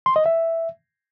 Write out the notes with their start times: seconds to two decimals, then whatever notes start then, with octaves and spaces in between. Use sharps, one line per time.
0.06 C6
0.16 D#5
0.26 E5